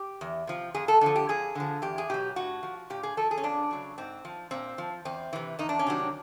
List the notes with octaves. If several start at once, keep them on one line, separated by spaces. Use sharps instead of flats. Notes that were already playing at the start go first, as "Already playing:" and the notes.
Already playing: G4
E2
C3 F3
F2 G#4
A4
D3 F3 A4
G4
F2 G#4
D3 F3
E2 G4
G#4
B2 F#3 G4
A2 F#4
F3
A#2 G4
G#4
F3 A4
G#4
C#4
F2 D4
C#3 F#3
G#2 C4
F3
A#2 C4
F3
E2 C4
C3 E3
E2 D#4
D4
C#4
C3 D#3 F#3 D4